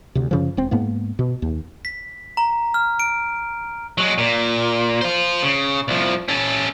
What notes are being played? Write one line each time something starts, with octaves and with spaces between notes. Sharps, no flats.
D2 C3
F#2 C#3 F3
E1 C4
G#2 A#3 B3
B2
D#2
B6
A#5
F6
D7
F#3 G#3
A#2
F4 C5
C#3
C2 F3
C#4 A4